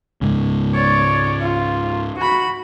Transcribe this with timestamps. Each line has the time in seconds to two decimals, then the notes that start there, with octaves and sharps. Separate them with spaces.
0.22 C#2 G#2 C#3
0.74 C#5 D5
1.40 F4
2.17 F#4 B5